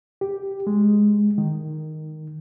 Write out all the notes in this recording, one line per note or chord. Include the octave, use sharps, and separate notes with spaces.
G4
G#3
D#3